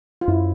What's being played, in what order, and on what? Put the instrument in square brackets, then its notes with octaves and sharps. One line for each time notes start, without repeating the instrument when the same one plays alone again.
[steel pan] F4
[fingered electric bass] F#2 [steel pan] E4